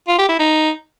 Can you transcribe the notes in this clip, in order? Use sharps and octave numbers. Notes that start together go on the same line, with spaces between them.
F4
G4
E4
D#4